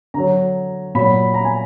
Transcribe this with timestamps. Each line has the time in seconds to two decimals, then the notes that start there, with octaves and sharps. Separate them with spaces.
0.14 D3 F#3 A#5
0.95 A#2 F#3 B5
1.34 A#5
1.45 G#5